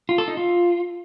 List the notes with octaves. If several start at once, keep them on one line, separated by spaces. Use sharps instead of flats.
F4
A4
D#4
F4